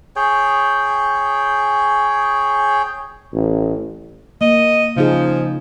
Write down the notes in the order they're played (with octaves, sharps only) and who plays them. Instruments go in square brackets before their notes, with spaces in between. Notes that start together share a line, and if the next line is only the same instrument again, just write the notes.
[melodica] G#4 C#5 G5
[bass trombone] A1
[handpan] A#3 [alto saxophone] D#5
[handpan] C#3 D#4 G#4 [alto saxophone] F3